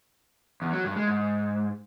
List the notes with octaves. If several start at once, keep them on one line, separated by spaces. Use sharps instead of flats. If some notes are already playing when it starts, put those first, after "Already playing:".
E2
F#3
G2
G#3
G#2